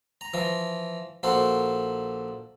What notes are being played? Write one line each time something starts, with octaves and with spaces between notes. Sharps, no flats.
A#5
E3 F3 A#5
A#1 A#3 F#4 A4 C5